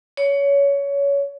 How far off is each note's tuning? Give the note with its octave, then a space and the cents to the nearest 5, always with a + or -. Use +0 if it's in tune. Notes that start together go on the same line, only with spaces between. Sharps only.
C#5 +20